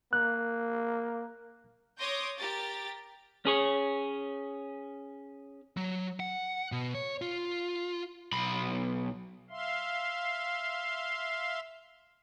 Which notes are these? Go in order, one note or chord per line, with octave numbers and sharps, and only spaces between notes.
A#3 F#6
C#5 C6 D6 D#6 G6 A#6
G4 A#4 A6
C#4 G#4 C#5
F#3
F#5
B2
C#5
F4
B1 B5
E5 F5 C6